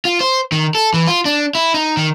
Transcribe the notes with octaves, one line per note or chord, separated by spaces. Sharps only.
F4
C5
D#3
A4
E3
F4
D4
E4
D#4
D#3